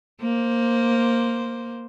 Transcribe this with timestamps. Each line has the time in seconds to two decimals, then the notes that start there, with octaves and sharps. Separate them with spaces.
0.22 A#3 C5